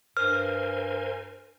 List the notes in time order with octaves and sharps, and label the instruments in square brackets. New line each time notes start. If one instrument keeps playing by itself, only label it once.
[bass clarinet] G2 [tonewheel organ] A#4 C5 G#5 [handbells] F6